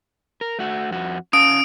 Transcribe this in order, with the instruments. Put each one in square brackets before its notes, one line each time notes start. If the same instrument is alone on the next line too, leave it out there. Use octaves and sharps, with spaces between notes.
[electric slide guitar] A#4
A3 F#4
F2 F#4
[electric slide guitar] C#4 F5 A5 [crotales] D#6 D7